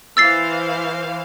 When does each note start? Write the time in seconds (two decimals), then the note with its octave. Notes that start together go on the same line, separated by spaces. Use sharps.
0.17 E3 C5 F5 E6 A6 C7